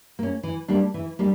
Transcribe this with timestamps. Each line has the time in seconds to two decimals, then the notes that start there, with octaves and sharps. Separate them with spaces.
0.19 A#3 C#4
0.43 E3
0.68 G3 A#3 D4
0.94 E3
1.19 G3 A#3 D4